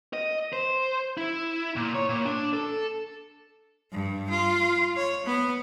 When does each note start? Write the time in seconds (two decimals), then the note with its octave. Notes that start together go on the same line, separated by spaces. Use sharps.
0.13 D#5
0.53 C5
1.18 E4
1.76 A#2
1.95 C#5
2.09 A#2
2.25 D4
2.53 A4
3.92 G2
4.30 F4
4.96 C#5
5.26 B3